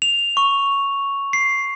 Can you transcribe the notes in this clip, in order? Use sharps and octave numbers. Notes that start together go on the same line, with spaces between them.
F7
C#6
C7